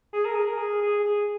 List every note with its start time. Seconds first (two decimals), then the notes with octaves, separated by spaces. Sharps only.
0.13 G#4
0.25 A#4
0.35 G#4
0.47 A#4
0.58 G#4
0.82 G#4
1.04 G#4